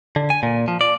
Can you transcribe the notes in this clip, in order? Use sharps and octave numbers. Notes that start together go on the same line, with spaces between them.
D3
G#5
A#2
F3
D5